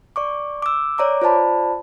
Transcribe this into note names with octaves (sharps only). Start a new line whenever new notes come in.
D5 C#6 D6
D6 E6
C#5 D5 A#5 D6
F4 C5 D5 A5 B5